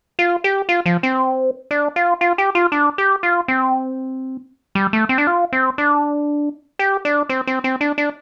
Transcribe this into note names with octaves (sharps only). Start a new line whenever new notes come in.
F4
G4
F4
F3
C4
D4
F4
F4
G4
F4
D4
G4
F4
C4
G3
A3
C4
D4
F4
C4
D4
G4
D4
C4
C4
C4
D4
D4